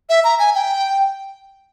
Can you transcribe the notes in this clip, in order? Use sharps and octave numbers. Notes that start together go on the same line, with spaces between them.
E5
A#5
G#5
G5